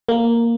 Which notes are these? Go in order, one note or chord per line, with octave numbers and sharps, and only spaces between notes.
A#3